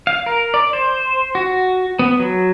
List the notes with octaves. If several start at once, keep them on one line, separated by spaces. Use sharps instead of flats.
F5
A#4
D5
C5
F#4
B3
F#3